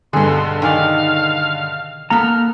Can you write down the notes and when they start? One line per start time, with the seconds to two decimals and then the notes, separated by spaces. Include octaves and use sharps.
0.13 G2 B2 D3 G#4 C6
0.62 D#3 G#4 D5 F5
2.10 A#3 B3 A4 A#5 F6